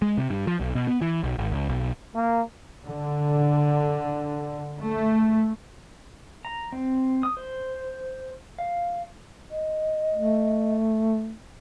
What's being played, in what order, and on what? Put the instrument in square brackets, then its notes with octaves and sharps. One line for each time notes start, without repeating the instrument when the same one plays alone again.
[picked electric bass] G#3
C3
G2
F3
B1
B2
B3
E3
B1
G#1
C#2
B1
[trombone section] A#3
[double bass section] D3
A3
[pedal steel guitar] A#5
C4
D#6
C5
F5
[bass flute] D#5
[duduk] A3